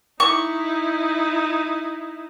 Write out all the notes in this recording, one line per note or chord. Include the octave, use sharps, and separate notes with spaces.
D#4 E4 C#6